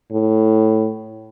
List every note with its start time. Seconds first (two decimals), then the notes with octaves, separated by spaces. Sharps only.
0.12 A2